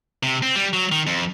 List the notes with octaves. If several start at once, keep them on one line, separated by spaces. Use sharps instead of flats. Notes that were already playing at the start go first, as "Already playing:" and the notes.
C3
C4
G3
F#3
D#3
F2